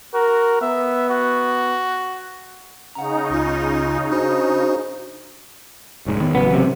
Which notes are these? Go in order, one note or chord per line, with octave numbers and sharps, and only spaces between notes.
F#4 A#4
B3 E5
F#4
C#3 D#4 F#5 A#5
C#2 F4
D4 F#4 C5
F1 G#2
D#3 B3
A1 C#3 F#3 B3
C3